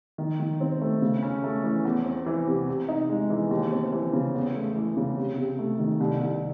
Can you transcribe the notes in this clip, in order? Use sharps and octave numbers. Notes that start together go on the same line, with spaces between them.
D#3
D#3
C4
A3
C#3
C#4
A3
E3
E2
C4
E3
C3
C3
D#4
G#3
E3
D#2
C4
E3
C#3
E2
A3
E3
C#3
C3
C3
A3
D#3
C2
C2